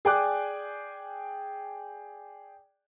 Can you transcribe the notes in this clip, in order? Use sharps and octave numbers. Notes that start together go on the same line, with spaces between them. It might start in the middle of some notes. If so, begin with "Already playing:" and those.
G#4 D5 G5 G#5 D6 F#6